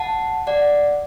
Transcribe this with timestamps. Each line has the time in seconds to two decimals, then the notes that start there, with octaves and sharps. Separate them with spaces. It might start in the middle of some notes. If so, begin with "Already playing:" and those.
Already playing: F#5 A5
0.47 D5 F#5